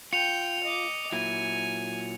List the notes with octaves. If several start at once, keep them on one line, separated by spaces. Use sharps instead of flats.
F4 G5 C#7 F7
D#5 D6
A#2 F#3 E4 G#5